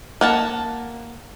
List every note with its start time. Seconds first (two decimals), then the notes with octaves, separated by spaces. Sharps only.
0.21 A#3 F#5 A5